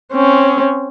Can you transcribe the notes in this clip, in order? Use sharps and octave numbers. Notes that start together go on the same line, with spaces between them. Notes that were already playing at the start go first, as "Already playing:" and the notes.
C4 C#4